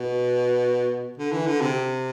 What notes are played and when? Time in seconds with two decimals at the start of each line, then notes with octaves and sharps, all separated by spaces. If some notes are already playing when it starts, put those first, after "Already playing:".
Already playing: B2
1.18 D3
1.32 E3
1.47 D3
1.61 C3